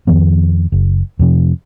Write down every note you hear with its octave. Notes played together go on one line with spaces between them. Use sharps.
F2 D#3 F3 B3
F#1
F2 C3 F3